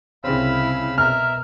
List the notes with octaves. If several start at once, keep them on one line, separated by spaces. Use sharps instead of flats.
C2 C#3 C4 E4 F5 B5 E6
B2 A#4 E5 F6